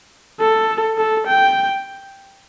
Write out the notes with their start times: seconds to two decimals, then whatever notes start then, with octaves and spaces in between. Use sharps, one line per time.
0.40 A4
0.98 A4
1.27 G5